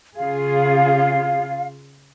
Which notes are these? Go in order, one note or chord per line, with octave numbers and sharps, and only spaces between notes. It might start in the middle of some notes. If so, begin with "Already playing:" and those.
C#3 F4 G#4 F5